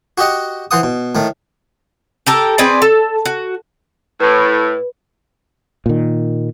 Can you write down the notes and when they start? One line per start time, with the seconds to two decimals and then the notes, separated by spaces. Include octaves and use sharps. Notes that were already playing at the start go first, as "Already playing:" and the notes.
0.18 F#4 G4 D#5 F#5
0.71 E3 C5 F#5 D#6
0.83 B2
1.15 A2 D#3 A3
2.27 G4 A4 A#4
2.58 C4 G#4 B4 D5
2.82 A4
3.26 F#4
4.21 A2 B4
5.86 A#2 D#3